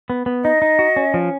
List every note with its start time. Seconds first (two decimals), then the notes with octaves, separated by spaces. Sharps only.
0.10 B3
0.26 B3
0.44 D#4 D#5
0.62 D#4
0.79 F#4
0.96 C#4
1.14 F3